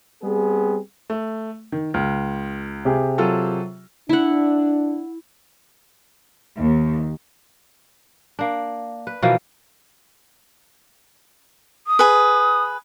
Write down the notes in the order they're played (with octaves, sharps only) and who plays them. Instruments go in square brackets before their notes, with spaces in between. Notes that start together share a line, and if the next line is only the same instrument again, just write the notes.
[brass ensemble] G3 B3 C4 G#4
[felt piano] A3
D#3
[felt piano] C#2 [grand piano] F6
[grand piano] C3 G4 G#4
[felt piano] F#3 F4 A4
[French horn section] D4 [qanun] E4 F#5
[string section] D#2
[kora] A#3 D4
B4
B2 E3 F3 A#3
[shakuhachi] D#6
[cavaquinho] G#4 B4